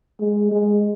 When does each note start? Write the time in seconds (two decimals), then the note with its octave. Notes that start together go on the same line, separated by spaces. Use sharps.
0.20 G#3
0.51 G#3